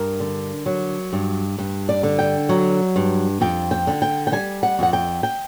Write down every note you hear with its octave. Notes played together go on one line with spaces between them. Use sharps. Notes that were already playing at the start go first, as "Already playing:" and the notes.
Already playing: G2 A#4
D3
F#3
G2
G2
D5
D3
G5
F#3
G2
F2 G5
G5
D3
G5
G5
G3 G#5
F#5
F2 F#5
G5
G5